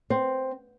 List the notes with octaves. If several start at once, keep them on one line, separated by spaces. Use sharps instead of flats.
C4